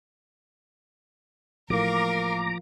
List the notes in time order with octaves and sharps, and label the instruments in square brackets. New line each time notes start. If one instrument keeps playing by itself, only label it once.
[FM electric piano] A1 A2 A#3 [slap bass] F3 [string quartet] A#4 F5 [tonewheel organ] A#5 D6